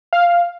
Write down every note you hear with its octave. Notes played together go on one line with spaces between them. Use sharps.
F5